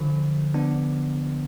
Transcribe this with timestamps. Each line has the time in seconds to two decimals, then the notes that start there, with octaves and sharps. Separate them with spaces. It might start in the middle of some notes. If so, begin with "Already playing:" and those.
Already playing: D3 F3
0.54 B3 D4